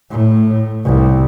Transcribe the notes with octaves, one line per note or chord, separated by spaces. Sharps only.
A2
C2